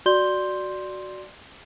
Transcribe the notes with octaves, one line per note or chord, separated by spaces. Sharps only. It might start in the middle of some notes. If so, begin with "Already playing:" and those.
F#4 D5 C6 G6 G7